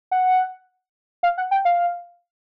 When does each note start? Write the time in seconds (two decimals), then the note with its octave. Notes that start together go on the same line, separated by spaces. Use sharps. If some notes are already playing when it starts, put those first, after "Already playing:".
0.11 F#5
1.23 F5
1.38 F#5
1.51 G5
1.65 F5